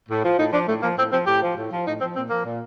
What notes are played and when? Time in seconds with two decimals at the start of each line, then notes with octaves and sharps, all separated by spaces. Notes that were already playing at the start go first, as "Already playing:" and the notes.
0.09 A2
0.23 F3
0.38 A2 D#4
0.52 F3 D4
0.68 A2 A3
0.82 F3 A#3
0.97 A2 C4
1.12 F3 C4
1.26 A2 G4
1.42 F3
1.56 A2
1.71 F3
1.86 A2 D#4
2.00 F3 C4
2.16 A#2 C4
2.30 F3 A#3
2.45 A#2